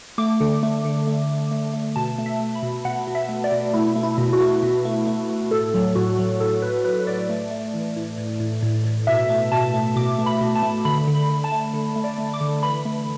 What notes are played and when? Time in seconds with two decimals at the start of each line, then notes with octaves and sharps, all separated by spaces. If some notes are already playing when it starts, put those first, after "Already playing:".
0.18 A3 D6
0.40 D3
0.63 A3
0.85 D3
1.07 A3
1.29 A3
1.51 A3
1.74 A3
1.96 B2 A5
2.18 A3
2.26 E5
2.40 A3
2.55 B5
2.63 B2
2.85 B2 F#5
3.07 B2
3.15 E5
3.29 A3
3.44 D5
3.52 B2
3.73 A3 E4
3.96 A3
4.03 E4
4.18 B2
4.33 F#4
4.40 A3
4.62 B2
4.85 A3
5.07 A3
5.29 A3
5.51 A2 A4
5.74 F#3
5.95 A2 F#4
6.19 F#3
6.40 A2 A4
6.62 A2 B4
6.84 F#3 B4
6.99 B4
7.07 A2 D5
7.29 A3
7.51 A3
7.74 E3
7.96 A2
8.18 A2
8.40 A2
8.63 A2
8.85 A2
9.07 B2 E5
9.29 A3
9.52 B2 A5
9.74 A3
9.96 B2 D6
10.18 A3
10.26 B5
10.41 B2
10.55 A5
10.63 A3
10.85 D3 B5
11.07 D3
11.15 B5
11.30 D3
11.44 A5
11.52 A3
11.74 D3
11.96 A3
12.04 D5
12.18 A3
12.34 D6
12.41 D3
12.63 E3 B5
12.85 A3